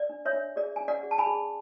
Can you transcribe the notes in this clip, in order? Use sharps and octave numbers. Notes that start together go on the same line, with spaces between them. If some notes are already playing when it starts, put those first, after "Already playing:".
Already playing: D5
D4
C#5 E5
D4
G#4 D5
C#4 G#5
D5 F#5
G#4
A5
G#5 B5
G#4